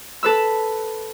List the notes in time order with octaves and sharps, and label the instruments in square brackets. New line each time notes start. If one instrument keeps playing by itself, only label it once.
[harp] A4 B4 E6